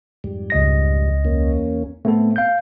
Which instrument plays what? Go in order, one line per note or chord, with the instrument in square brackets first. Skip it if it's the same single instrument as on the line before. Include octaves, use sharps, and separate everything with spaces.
[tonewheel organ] F2 G#2 G3
[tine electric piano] C#2 D#5 A#6
[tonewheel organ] E2 A#3 C#4
[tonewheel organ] A2 C4 [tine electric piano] A3 B3 A4
[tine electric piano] F5 G6